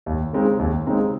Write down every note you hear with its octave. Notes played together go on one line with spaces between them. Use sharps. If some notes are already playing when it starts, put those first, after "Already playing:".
D#2
C#3 G#3 C4 D#4
D#2
C#3 G#3 C4 D#4